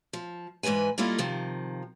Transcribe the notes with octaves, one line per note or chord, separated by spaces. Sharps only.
F3
G#2 D#3 E3 B4 G#5
G3 A#3 E4 F4 A4 D#5
C3 D#3 F3